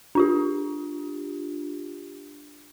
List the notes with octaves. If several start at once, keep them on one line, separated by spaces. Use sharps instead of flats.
D4 F4 G4